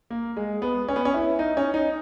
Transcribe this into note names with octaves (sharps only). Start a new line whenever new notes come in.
A#3
G#3
B3
C#4
B3
C#4
E4
D#4
C#4
D#4